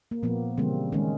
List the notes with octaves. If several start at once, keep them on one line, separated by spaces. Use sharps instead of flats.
A#3
A#2 F3 A#3 B3
C#3 E3 G3 A#3 C4
D#3 G#3 C#4